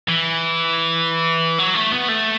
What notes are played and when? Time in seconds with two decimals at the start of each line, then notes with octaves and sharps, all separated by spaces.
0.09 E3
1.59 F#3
1.75 A3
1.92 B3
2.09 A3